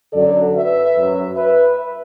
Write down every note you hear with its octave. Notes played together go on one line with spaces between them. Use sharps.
F#2 D3 F#3 A4 D5
B4 E5
F#2 F#3
B4 E5